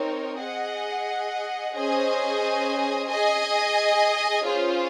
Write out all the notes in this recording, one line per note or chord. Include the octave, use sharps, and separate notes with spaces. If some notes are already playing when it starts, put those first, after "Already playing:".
Already playing: C4 D#4 A#4 C#5
G#4 D#5 F#5
C#4 G#4 C5 D#5 G#5
G#4 D#5 G#5
C#4 F4 G#4 C5